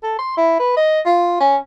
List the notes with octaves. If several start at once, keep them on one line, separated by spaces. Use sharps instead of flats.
A4
C6
E4
B4
D#5
F4
C#4